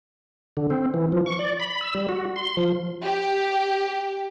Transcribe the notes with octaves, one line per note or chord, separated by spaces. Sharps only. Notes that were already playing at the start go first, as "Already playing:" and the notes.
D3
C4
E3
F3
C#6
D5
B5
E6
G3
F#4
C6
F3
G4